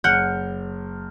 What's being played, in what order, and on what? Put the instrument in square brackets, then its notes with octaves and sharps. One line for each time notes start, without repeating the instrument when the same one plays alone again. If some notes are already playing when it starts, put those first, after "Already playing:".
[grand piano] F#1 F6 G6 [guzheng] F#5